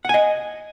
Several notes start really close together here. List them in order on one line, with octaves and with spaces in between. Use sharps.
F#5 G#5 D#5